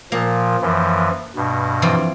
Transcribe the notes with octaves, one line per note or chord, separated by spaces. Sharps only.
A#2 F3 A#3
F#2 E3 F3
G2 B2
E3 F3 C4